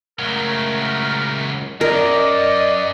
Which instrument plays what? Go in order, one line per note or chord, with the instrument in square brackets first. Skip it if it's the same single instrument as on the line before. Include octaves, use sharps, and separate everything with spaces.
[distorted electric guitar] C#2 F#3 [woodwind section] A3 A#4
[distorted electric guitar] F#2 [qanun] A#4 [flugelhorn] D5 [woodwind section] D#5